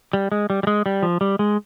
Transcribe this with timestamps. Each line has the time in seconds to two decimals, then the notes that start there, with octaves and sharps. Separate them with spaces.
0.13 G3
0.32 G#3
0.50 G3
0.63 G3
0.67 G#3
0.86 G3
1.02 F3
1.21 G3
1.39 G#3